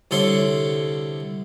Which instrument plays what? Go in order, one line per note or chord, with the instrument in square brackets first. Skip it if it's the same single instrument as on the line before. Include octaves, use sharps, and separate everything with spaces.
[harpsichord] C2 D3 A4 C#5 C6